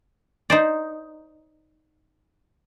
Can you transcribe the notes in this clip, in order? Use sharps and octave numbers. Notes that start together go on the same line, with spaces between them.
D#4 C5 D5